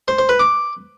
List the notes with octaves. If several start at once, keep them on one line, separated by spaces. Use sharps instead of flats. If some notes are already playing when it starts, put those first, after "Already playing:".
C5
C5
B4
D6